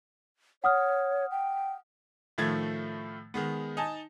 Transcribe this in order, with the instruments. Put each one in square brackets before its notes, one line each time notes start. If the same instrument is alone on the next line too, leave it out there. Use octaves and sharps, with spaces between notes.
[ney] C#5 [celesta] F#5 D#6 F6
[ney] G5
[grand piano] A2 D#3 F3 A3 G#6 A6
D#3 G#3 B3
D#4 G#5 A5